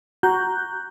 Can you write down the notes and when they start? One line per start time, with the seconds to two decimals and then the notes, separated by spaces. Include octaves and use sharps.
0.23 F#4 A#5 F#6 G6